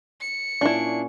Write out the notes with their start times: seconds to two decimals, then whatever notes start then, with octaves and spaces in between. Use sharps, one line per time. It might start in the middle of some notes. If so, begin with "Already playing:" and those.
0.21 C#7
0.61 A#2 C#4 D4 E4 C#6